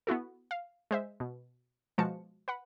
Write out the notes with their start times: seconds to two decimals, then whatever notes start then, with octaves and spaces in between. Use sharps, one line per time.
0.07 B3 E4 F#4 A4
0.51 F5
0.91 G#3 C5 E5
1.20 B2
1.98 B2 F3 G#3 F#4 A5 C#7
2.48 B4 F#5 B5